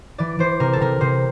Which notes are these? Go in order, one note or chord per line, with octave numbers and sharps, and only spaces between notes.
E3 D5
E3 C5
C3 A#4
A4
C3 A#4
C3 C5